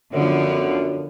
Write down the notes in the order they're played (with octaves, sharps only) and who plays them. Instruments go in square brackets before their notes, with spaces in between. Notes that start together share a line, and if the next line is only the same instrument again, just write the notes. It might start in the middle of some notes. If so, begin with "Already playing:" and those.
[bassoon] F#2 [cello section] D3 F3 B3